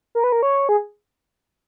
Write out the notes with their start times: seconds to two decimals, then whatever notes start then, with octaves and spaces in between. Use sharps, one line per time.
0.15 A#4
0.24 B4
0.32 A#4
0.43 C#5
0.69 G#4